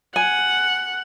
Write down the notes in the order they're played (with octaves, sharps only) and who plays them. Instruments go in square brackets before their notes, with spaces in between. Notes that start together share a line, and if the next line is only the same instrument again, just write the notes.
[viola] F#5 [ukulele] G#5